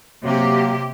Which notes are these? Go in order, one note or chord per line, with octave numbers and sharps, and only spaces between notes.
C3 F#3 A#3 G4